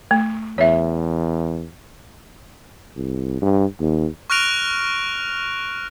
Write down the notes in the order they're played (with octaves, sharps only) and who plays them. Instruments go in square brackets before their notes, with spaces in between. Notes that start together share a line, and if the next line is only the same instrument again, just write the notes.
[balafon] A3
[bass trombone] E2 [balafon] C#5 E5
[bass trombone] C2
G2
D#2
[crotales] C#6 F6 F#6 A#6 D7 F7